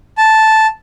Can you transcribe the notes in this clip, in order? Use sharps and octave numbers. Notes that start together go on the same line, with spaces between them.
A5